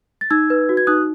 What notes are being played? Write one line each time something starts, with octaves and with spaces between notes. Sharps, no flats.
A6
D#4 E6 G#6
B4
F#4
G#6
D#4 D#6 F#6